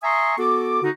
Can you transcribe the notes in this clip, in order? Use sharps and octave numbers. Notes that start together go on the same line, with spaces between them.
E5 G#5 A#5 C6 C#6 D#6
B3 F#4 A4 D6
D3 D#4 F#4